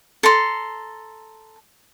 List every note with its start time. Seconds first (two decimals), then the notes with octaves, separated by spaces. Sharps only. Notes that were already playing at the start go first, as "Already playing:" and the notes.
0.23 A4 A#5 C6